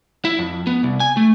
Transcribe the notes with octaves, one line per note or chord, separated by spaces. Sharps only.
E4
F2
B3
C2
G#5
A3